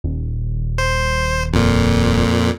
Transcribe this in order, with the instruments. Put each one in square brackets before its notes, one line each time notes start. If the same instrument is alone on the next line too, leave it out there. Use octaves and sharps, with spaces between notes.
[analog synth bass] D#1
[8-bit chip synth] C5
F2 A#2